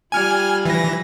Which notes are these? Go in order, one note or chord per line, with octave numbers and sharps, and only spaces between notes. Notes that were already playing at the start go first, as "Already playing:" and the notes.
G3 F4 G#5 F6
E3 A#6